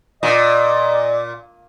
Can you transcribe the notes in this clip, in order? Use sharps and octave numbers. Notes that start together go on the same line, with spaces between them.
A#2 D5 D#5